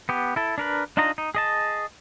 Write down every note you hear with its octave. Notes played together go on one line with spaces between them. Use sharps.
B3 G4
E4 A4
D4 A#4 B4
D4 D#4 F4 D#5 A#5
D#4
G#4 D#5 A5